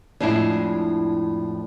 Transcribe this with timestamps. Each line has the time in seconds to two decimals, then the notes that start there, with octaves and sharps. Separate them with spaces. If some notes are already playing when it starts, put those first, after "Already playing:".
0.20 F2 A2 G#3 D4 E4